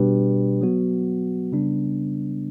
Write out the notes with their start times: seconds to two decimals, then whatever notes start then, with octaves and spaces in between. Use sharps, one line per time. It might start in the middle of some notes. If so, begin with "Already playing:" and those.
Already playing: B2 G3 D4 G4 B4
0.61 F#3 B3 F#4
1.52 C#3 G3 B3 D4